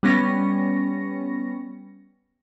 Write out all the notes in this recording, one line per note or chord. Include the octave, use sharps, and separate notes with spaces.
G3 B3 C#4 A#6 C#7